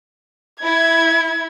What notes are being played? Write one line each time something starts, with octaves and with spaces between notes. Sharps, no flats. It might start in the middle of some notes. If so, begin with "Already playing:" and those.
E4 G#6